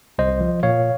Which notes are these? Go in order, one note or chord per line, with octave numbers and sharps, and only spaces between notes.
C2 C5 D#5
F3
A#2 C#5 F5